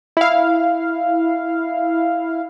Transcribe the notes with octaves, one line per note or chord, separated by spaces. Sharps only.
E4 F5